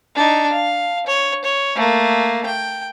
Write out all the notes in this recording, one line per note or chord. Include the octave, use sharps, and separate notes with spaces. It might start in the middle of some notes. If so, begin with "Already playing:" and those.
D4 D#4
F5
C#5
C#5
A3 A#3
G5